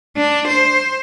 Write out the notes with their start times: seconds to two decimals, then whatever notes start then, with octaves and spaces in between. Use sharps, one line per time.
0.17 D4
0.48 C5